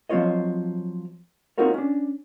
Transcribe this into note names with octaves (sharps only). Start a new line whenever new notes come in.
F3 F#3 C4 F4 C#5 D#5
C4 D#4 F4 F#4 A#4 C#5
C#4 D4